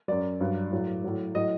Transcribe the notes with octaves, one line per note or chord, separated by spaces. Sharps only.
F#2 F#3 D5
G2 F#3
A2 F#3
A2 F#3
A2 F#3 D#5